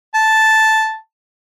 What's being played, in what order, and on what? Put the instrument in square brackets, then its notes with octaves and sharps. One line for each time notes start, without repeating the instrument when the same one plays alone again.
[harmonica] A5